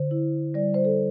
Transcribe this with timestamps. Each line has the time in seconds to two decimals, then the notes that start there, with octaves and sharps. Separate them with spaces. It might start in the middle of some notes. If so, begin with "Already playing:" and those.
Already playing: D3 C5
0.11 E4
0.54 G3 D5
0.74 C5
0.85 A4